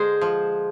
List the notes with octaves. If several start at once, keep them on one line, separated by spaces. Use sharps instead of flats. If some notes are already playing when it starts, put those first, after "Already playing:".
Already playing: D3 G#3 C5
F3